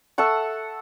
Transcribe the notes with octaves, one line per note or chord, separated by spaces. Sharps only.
A4 E5 F#5 C#6